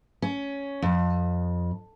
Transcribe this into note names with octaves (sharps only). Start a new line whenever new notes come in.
C#4
F2